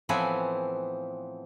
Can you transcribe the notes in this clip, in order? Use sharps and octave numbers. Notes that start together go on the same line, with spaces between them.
A2 E3 F3 B3 C4 G#5